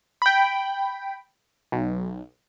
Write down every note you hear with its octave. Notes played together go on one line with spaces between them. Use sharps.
G5 B5
B1